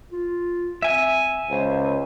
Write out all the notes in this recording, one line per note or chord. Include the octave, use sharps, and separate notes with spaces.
F4
C4 E5 G#5
C#2 C5